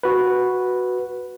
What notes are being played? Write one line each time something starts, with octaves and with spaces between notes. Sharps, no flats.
F#4 B4